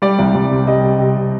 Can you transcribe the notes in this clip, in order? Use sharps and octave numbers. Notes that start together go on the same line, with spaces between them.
G3 D5
C2
C2
C3
G3 D#5
C3
C3
C3